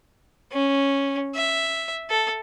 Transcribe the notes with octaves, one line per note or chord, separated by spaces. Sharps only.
C#4
E5
A4